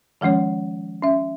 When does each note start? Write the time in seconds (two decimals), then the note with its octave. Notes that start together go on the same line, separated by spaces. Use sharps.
0.21 D#3 F3 G#3 C#4 C#5
1.02 C#4 E5